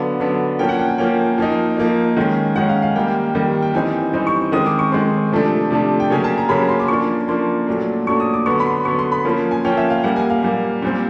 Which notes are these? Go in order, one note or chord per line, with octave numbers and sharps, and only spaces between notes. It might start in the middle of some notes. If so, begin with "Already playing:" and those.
Already playing: D3 F#3 B3 D4 F5
D3 F#3 B3 D4
F3 A#3 C#4 G5
F#5
G5
G#5
F3 A#3 C#4 G5
F3 A#3 D#4
F3 A#3 D#4
D#3 G#3 C#4
D#3 G#3 C#4 F#5
F5
F5
D#3 G3 A#3 G5
D#3 G3 A#3
G5
E3 G3 C4 D#4 G#5
E3 G3 C4 D#4
C#6
D#3 G#3 C4 D#6
D6
C#6
D#3 G#3 C4 C6
C3 F3 A3 D4
C3 F3 A3 D4
G5
C#3 F#3 A#3 C#4 G#5
A5
A#5
C#3 F#3 A#3 C#4 B5
C6
D6
F3 A#3 D4 C#6
F3 A#3 D4 C6
A#2 F#3 A3 D4
A#2 F#3 A3 D4 C#6
D#6
D6
D3 F#3 B3 C#6
B5
C6
D3 F#3 B3 C#6
C6
B5
F3 A#3 C#4
G#5
F3 A#3 C#4 G5
E5
F5
A#2 G3 A#3 F#5
G#5
F5
A#2 G3 A#3
A#2 G3 C4